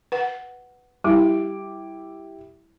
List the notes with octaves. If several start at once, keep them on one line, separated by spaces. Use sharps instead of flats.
B4 F#5
G3 E4 G4 D6